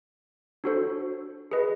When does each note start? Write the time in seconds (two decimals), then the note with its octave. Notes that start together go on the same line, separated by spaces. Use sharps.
0.64 D4 F#4 A4 C5
1.51 G#4 B4 D#5